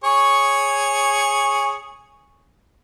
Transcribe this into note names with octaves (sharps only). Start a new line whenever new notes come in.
G#4 C#5 C#6